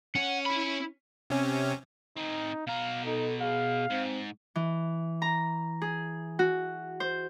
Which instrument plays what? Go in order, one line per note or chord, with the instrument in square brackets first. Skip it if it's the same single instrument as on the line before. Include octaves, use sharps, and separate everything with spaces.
[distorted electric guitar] C#4 [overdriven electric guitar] F#5
[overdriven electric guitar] E4 B5
[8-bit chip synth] C3 C#4
[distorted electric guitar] C4 G#4 [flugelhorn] D#4
[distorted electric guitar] B2 A#5 [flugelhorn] F5
[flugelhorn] D#4 [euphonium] A4
[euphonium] G#4 [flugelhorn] F5
[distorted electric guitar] G#2 [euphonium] C4
[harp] E3
A#5
G#4
F#4
C5